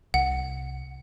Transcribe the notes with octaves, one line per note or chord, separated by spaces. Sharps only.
C2 F#5